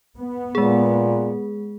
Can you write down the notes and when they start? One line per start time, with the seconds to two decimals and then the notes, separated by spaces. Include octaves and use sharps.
0.18 B3
0.55 A#2 G#3 G#4